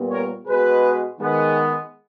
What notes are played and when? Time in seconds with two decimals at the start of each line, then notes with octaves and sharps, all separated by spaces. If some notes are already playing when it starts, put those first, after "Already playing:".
Already playing: A#2 G3 B3
0.10 A#4 C#5
0.47 B2 G#3 B3 G#4 B4
1.20 D#3 G#3 B3